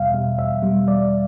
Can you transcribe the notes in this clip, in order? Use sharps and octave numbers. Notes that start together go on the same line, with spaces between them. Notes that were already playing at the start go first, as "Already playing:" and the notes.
Already playing: E2 B2 G3 E5 F5
B2 G3
E2 E5
B2 G3
E2 D5